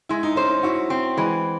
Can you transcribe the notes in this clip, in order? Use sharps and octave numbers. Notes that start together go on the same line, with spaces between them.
G#3 E4
D#4
C#4 C5
D#4
E4 F#4
C4
E3 G#3